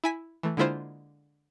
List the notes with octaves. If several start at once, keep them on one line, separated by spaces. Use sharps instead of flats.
E4 G#5 B6
E3 A3
D3 G#3 A#3 E4 F4 C5